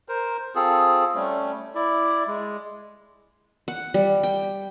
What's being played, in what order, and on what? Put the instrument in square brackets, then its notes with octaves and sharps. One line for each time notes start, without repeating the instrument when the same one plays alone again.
[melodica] A#4 C5
C4 F4 G#4 A4
G3 A3 C#4
E4 D5
G#3
[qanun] F#5
G3
G5